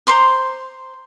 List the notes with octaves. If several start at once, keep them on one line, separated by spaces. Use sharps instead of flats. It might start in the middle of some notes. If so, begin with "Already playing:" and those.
C5 A#5 C6 D6